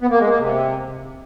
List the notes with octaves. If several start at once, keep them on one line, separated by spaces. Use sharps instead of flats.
B3
A#3
G#3
A#3
C3